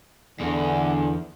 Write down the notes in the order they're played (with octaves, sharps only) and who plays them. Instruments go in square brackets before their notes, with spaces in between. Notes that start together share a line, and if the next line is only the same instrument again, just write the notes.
[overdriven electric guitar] E2 [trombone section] D3